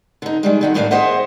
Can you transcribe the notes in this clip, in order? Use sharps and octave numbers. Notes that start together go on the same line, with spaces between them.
D3 D#4
D#3 G3 G#3
D3 D#3 F#4
D#2 A2 F3 A#3 D4 F5
G4 G#4 C5 D#5 E5 F#5